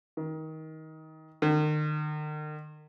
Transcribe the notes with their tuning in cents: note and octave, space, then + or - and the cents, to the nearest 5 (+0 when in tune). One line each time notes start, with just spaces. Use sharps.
D#3 +20
D#3 -40